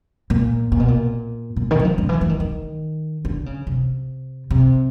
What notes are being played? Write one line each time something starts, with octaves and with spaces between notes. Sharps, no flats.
A#2
A#2
B2
A#2
A#2
D#3
F#3
F3
D3
E3
E3
D#3
D#3
D3
C#3
C3
C3